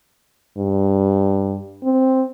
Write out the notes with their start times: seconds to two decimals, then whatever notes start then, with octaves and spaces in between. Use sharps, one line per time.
0.58 G2
1.84 C4